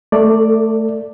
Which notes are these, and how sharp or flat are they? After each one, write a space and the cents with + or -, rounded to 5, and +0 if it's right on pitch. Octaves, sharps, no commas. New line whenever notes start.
A3 +0 A4 +35 D5 +0